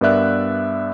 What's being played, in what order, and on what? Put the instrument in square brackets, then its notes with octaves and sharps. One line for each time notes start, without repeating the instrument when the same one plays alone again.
[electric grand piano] G2 B3 A#4 D5 E5 F#6